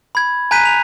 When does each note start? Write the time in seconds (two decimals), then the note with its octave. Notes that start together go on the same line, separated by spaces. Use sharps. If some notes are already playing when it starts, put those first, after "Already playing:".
0.15 B5 G#6
0.51 G#5 A#5 F#6 G6 B6 D#7
0.65 F7